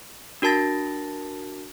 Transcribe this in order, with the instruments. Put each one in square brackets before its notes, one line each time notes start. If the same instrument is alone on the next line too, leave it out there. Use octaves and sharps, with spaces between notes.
[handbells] D4 F#4 A#4 A5 A6 A#6